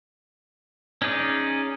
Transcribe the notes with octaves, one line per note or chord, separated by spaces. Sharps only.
C#4 D#4 G#4 D5